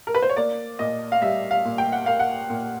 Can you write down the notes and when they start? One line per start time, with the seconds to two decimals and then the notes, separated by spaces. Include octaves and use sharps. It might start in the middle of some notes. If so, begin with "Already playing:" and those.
0.07 A#4
0.15 B4
0.22 C5
0.30 C#5
0.36 A#3 D5
0.79 A#2 D#5
1.12 F5
1.22 G3 E5
1.51 F5
1.65 A#2
1.78 G5
1.92 F#5
2.06 A#3 F5
2.20 F#5
2.50 A#2